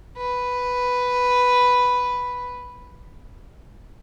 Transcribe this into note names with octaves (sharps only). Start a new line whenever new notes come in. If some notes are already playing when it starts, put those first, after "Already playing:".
B4